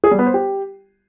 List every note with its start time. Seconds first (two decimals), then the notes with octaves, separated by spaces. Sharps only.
0.04 G#4
0.11 G3
0.19 B3
0.26 C5
0.34 G4